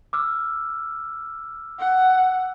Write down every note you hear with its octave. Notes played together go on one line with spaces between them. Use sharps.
D6 E6 F6
F#5